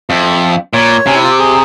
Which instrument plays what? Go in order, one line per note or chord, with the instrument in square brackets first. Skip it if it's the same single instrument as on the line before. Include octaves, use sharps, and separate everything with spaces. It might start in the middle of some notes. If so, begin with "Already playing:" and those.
[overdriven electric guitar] F2 [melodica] E5
[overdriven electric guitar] A#2 [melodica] C#5
[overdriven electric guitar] C3 [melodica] C#4
[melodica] E4
F4
G4
G#4